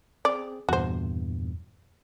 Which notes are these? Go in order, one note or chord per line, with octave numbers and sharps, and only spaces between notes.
C4 G#4 D5
E2 G2 A#2 F#4 C5